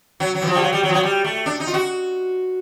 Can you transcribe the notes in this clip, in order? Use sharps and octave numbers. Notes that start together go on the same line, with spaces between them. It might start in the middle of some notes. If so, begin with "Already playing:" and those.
F#3
F#3
E3
F3
G3
F#3
G3
F#3
F3
F#3
G3
A3
D4
D#4
F4
F#4